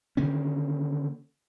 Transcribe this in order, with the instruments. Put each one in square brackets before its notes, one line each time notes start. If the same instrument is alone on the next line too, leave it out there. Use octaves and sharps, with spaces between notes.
[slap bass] D3 D#3 A#3 C#4